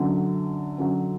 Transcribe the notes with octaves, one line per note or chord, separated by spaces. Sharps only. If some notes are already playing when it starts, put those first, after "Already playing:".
Already playing: F#2 D3 F#3
F#2 D3 F#3